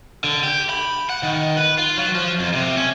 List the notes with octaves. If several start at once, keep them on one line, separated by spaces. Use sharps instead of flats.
D3
G4
B5
F#5
D#3
B4
F4
F#3
F3
F2
C3
C#4